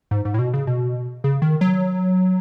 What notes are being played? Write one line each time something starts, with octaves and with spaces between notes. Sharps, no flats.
G#2
G#2
A2
B2
C#3
B2
C#3
D#3
F#3